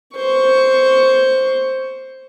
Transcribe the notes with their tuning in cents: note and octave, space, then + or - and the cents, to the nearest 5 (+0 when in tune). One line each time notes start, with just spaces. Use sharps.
C5 +5 C#6 +10